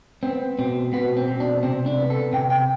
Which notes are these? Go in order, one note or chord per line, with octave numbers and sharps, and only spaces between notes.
B3 C4
B2 C4
B2 B3
C4
B2
D4
C3 C4
D4
B3
A4
C3 G5
G5